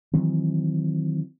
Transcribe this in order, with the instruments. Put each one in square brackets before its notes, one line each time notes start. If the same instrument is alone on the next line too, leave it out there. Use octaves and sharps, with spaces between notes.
[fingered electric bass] D#3 E3 F#3 C4